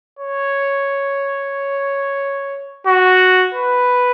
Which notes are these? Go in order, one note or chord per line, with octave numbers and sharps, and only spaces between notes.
C#5
F#4
B4